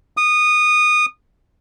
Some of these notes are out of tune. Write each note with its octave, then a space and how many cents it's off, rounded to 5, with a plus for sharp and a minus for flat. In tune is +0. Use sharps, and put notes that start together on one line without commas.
D#6 -20